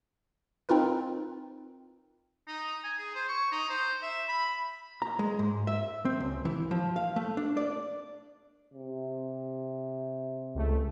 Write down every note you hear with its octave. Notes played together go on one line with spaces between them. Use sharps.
C4 D#4 F4 A#4 B4
D#4
G#5
G#4
C5
C#6
D#4
C5
E5
B5
A#5
G#3
G#2
E5
C4
C#2
E3
F3
F5
A3
D4
D5
C3
C#2 A3